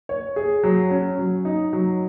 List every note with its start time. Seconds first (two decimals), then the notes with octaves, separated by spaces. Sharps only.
0.09 C#5
0.36 G#4
0.63 F#3
0.91 C#4
1.19 F#3
1.45 D#4
1.73 F#3